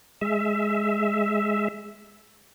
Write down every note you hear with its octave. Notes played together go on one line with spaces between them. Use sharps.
G#3 E5